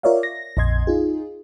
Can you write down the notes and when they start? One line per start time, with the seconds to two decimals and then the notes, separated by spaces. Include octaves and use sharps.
0.03 F4 A#4 C#5 D5 E5 F5
0.23 A#6
0.57 A#1 F2 D#5 C6 G#6
0.87 D#4 F4 G#4